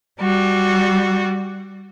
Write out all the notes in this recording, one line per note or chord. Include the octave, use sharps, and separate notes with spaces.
G3 F#4